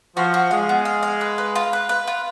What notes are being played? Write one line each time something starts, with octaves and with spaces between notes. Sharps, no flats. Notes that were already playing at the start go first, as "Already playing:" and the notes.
F3 F#4
F#4
G#3 F5
B3
F5
F5
B4
B4
F4
B4
B4
F4